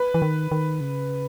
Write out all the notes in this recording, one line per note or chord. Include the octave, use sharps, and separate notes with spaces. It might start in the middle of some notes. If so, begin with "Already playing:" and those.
Already playing: B4
E3
D#3
D#3
C#3